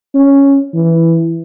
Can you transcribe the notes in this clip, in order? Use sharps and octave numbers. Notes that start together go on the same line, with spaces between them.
C#4
E3